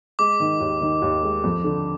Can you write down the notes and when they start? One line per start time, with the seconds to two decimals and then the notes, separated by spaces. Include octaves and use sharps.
0.19 G#3 D6
0.40 D#3
0.60 D#2
0.81 D#3
1.02 D#2
1.23 G#3
1.44 F2
1.64 D3